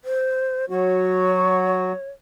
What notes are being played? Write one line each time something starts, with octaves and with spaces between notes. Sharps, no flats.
C5
F#3 F#4 C#5